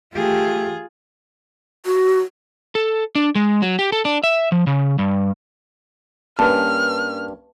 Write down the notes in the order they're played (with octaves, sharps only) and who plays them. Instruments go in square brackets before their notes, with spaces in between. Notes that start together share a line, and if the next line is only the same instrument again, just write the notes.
[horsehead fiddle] A3 G4 [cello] F4 G#4
[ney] F#4
[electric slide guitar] A4
D4
G#3
F#3
G4
A4
D4
E5
F3
C#3
G2
[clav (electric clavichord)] G2 [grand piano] A#3 C#4 [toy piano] B4 A5 [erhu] F6